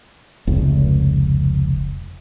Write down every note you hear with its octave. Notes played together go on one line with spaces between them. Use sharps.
F1 C#2